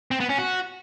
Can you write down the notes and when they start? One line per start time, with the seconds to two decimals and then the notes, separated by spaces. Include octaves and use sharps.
0.11 C4
0.20 B3
0.29 C#4
0.38 F#4